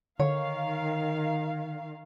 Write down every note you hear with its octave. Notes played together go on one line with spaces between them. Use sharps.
D3 D#3 C#5 F5